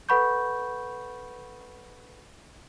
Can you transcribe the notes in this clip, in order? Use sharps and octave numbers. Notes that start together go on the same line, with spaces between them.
A4 B4 F#5 B5 C#6 G6